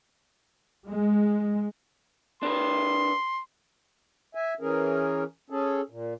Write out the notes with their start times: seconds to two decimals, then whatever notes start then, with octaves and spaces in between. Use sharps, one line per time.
0.85 G#3
2.43 D4 A#4 B4 C6
4.35 E5 G#5
4.60 E3 C#4 G#4 A#4
5.50 C#4 G#4 A4
5.90 A#2